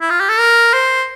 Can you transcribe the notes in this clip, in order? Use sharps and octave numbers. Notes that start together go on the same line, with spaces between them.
E4
F4
G4
A4
A#4
C5